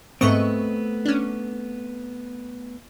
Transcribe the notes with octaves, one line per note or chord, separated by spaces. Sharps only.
G#2 A3 B3 C4 D#5 C#6
C#4 D4